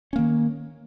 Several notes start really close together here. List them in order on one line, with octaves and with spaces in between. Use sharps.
C#4 A#3 D#3